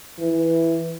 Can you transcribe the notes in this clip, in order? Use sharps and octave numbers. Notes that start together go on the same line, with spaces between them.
E3